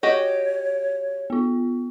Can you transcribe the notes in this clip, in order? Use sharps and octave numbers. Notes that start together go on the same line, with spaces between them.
F#4 G4 C#5 D#5
B3 F4